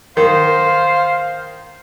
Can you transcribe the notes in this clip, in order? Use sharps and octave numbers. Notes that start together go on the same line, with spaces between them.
D#3 C5 F5